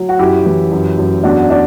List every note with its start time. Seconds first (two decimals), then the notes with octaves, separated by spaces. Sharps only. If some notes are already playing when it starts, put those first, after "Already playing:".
Already playing: F#3
0.09 F#4
0.19 F#2 E4 G4
0.46 E3
0.72 F#2
0.99 F#2
1.24 E2 D4 F#4
1.50 D4